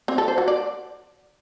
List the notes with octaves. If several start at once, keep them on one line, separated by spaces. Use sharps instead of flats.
C4
A4
C5
F#4
D5